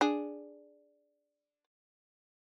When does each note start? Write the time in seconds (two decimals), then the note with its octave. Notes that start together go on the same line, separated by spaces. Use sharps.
0.01 D4 G#4